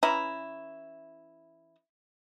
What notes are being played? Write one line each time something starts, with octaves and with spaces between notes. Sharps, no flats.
E3 C#4 E4 A#5